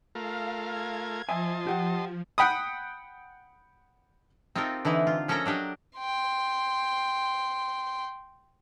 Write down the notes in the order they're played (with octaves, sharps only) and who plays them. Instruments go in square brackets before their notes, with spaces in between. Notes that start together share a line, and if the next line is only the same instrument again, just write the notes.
[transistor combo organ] A3 F4 A#4 [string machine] F5
[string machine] G#6
[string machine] F3 [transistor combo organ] D#5 A5 C6 [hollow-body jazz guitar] E5 G#5
[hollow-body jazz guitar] G4 F#5 G5
[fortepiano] F#5 G5 B5 D#6
[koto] C4 D#4 F4 G4 A4 A#4
D3 E3 D#4 E4
F4
F3 C#4 A4 A#4 E5 A#5
F#3 D4 G4 D#5
[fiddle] G5 C6